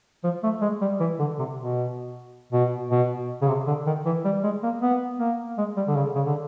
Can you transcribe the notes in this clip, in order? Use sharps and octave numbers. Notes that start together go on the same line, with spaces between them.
F3
A3
G#3
G3
E3
D3
C3
B2
B2
B2
C#3
C3
D3
D#3
E3
G3
G#3
A#3
B3
A#3
G#3
G3
D3
C#3
C#3
D3